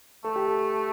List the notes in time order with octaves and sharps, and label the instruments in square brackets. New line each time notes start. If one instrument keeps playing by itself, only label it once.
[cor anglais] A3 [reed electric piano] A4
[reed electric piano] G4
A4